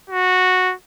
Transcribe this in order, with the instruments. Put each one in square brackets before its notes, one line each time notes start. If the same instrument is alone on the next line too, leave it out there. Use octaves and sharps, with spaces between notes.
[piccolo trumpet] F#4